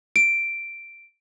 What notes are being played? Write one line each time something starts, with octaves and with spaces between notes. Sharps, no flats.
D7